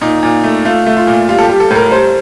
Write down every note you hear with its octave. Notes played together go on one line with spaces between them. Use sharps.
A#2 D#4
A#2
A3
A3 F4
A3
F4
A#2
G3 F4
A4
G4
G3
A4
A2 A#4
G3 C5